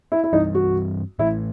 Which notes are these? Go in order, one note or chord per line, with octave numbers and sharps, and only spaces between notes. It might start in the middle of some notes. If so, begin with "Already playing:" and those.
E4
E4
G2 E3 G3 C4 D#4
F#4
A2 E3 A3 E4